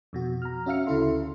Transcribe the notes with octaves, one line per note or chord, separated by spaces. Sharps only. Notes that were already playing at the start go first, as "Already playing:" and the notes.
F2 B2 F#4
A#5 F6
C#4 F#4 E5 F5 F6 C#7
D2 C#3 E4 A4 C6